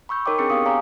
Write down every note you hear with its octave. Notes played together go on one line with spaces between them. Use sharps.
B5 C#6 E6 G6
D#4 A#4 C#5 D#5 G5 D6
C4 D4 G#4 G5 C#6 C#7
B3 G4 F5 D#6
C#5 F5 G#5 A#5 D6